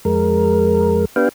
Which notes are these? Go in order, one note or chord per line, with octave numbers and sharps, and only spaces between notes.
F2 G#3 A#4
B3 D4 G4 B4 F5 G5